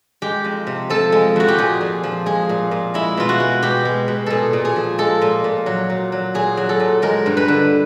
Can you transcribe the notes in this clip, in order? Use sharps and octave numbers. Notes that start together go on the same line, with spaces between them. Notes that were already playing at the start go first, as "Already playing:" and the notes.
G#3 G4
F2
C3
F3 A4
G#3
F2 F#4
G4
A#2 G#4
A#2
F3
G#3 G#4
A#2
A#2
G#3 E4
B2 F4
F#4
G#3
B2 G4
G#3
B2
A#2 G#4 A4
A#2
G#4
F3
G#3 A4
A#2
A#2
F#3
A#2
F#3
A#2 G#4
F#3
A4
A#2
G#3 A#4
G2
B4
D3